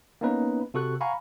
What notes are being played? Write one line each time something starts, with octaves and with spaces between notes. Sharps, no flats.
A#3 B3 C#4 D#4 B4
C3 F#4 A4 C#6 F#6
F5 F#5 G#5 A#5 B5 C#6